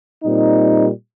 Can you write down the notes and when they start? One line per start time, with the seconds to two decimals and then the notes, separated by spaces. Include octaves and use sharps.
0.24 A#2 G3 C4 D#4